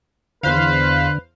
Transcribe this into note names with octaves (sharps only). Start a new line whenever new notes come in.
E2 D3 B4 C5 F5